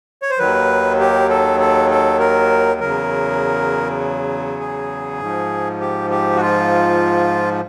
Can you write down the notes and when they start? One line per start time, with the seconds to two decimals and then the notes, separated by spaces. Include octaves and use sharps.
0.22 C#5
0.31 C5
0.39 D#2 D#3 F#3 B4
1.00 G4
1.30 A4
1.60 A4
1.90 A4
2.19 A#4
2.80 E2 C#3 F#3 A#4
4.60 G#4
5.20 G#2 F3
5.80 G4
6.10 G4
6.36 F#4
6.41 F4